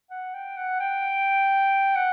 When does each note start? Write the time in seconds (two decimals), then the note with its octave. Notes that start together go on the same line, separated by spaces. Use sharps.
0.10 F#5
0.34 G5
0.57 F#5
0.80 G5
1.96 F#5